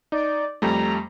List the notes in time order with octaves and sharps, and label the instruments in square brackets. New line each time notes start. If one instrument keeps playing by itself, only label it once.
[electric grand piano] D#4 [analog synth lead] D5
[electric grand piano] F2 G3 A3 [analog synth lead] A#5